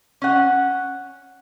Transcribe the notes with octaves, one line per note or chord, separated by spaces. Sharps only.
C#4 F#5